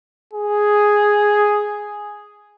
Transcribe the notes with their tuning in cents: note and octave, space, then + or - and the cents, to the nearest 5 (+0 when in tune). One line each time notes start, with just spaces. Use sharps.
G#4 +0